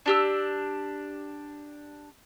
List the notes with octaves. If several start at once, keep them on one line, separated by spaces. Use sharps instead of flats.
D4 G4 E6